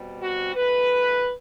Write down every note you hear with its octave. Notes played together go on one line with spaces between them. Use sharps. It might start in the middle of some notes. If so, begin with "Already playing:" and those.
Already playing: B2 G3 C4
F#4
G2 E3 A3 B4